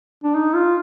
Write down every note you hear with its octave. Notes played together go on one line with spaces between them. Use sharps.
D4
D#4
F4